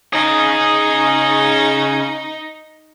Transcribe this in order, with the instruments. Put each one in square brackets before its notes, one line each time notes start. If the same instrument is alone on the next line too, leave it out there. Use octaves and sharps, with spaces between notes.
[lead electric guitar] C#3 G#4 [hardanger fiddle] D#4